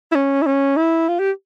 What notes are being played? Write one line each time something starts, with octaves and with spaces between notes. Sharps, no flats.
E4
C#4
E4
C#4
E4
F4
G4